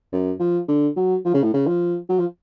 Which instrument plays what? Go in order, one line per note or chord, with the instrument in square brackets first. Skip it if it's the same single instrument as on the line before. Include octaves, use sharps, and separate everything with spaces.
[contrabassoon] F#2
F3
D3
F#3
F3
C#3
A2
C#3
F3
F#3
F3